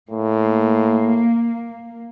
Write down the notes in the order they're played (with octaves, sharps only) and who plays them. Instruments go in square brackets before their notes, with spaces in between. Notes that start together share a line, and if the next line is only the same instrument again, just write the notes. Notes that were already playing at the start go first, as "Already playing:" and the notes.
[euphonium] A2 [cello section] A#3